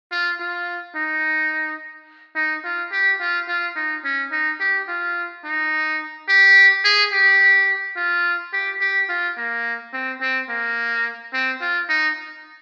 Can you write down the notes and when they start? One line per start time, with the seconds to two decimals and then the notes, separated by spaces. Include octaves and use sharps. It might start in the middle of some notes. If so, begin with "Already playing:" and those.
0.12 F4
0.39 F4
0.96 D#4
2.36 D#4
2.64 F4
2.92 G4
3.20 F4
3.48 F4
3.76 D#4
4.04 C#4
4.32 D#4
4.60 G4
4.88 F4
5.45 D#4
6.28 G4
6.84 G#4
7.13 G4
7.97 F4
8.53 G4
8.81 G4
9.09 F4
9.37 A#3
9.93 C4
10.21 C4
10.49 A#3
11.33 C4
11.61 F4
11.89 D#4